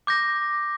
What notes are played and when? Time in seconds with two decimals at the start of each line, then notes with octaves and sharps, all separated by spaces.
0.07 D6 G6 A#6